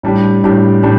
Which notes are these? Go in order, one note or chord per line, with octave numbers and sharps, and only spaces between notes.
A2 G3 D4 G4
A2 G3 D4 G4
A2 G3 D4 G4